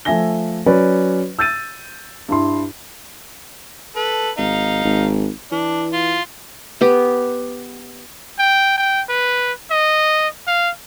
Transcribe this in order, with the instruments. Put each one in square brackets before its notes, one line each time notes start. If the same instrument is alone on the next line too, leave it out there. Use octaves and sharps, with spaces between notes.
[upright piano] F3 A3 E5 G#5 A#6 G7
F#3 C#4 B4 D5
E6 G6 A6 D#7
G2 E4 C6
[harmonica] A4 B4
[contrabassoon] G#1 [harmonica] D#4 F5
[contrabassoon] G#1
[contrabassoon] E3 [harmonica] D4
[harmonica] F4
[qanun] B3 G4
[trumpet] G5
G5
B4
D#5
F5